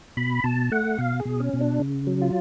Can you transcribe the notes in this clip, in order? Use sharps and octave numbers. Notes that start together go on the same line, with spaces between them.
B2 B5
B2 A5
A3 F#5
B2 F5
G#4
B2
C#4
B2
D4
C#3
F#3
F4